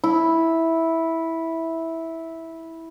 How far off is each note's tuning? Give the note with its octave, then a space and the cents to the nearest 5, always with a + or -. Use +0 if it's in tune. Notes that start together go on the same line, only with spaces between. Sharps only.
E4 -10